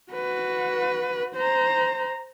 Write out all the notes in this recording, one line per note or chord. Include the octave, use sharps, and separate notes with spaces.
F#4 B4
C5 A#5